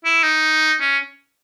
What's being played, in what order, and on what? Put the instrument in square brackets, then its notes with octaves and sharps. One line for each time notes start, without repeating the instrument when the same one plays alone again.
[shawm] E4
D#4
C#4